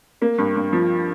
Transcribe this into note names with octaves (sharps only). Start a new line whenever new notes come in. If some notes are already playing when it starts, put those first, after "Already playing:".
A#3
G2
G2
F3